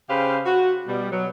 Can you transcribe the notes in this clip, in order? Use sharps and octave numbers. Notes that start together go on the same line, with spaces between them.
C#3 G4 B4 C5 F5
F#4
B2 G3
B2 F#3